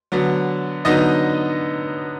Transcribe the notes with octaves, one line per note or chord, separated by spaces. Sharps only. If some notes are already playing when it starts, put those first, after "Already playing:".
D3 F#3 B3
D3 F#3 B3 D#4 D#5